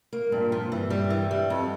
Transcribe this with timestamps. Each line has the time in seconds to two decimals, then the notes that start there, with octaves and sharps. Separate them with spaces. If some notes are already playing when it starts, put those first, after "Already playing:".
0.13 A#3
0.32 G2 A#2
0.52 F3
0.72 G2 E3
0.90 G3
1.10 E3
1.31 G3
1.50 F2